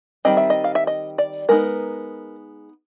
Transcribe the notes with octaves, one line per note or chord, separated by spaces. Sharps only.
D#3 G3 C4 D#5
E5
D#5
F5
E5
D#5
D5
G#3 B3 D#4 A#4